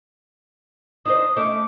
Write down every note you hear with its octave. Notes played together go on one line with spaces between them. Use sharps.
D4 D#4 C5 D#6
A3 C#4 D#4 D6